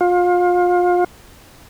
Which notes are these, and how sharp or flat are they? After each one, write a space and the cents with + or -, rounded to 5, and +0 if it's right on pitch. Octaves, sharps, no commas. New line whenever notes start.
F4 +30